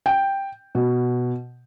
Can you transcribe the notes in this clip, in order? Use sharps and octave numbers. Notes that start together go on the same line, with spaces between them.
G5
B2